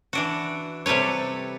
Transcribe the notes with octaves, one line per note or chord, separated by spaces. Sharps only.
E3 D4 F#4
C3 G3 A4 B4 C#5